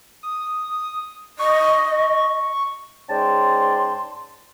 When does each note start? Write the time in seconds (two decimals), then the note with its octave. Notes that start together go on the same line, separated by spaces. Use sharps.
0.23 D#6
1.39 D#5 C#6
3.09 G#2 C#4 D5 G5 A5 C6